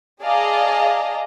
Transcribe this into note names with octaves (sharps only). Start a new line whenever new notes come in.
G#4 D5 D#5 F5 A5 A#5